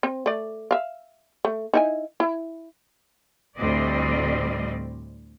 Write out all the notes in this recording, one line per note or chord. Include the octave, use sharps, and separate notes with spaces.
C4
A3 D5
E5 F5
A3
D#4 E4 G#5
E4
D2 A2 G3 C4 D5 D#5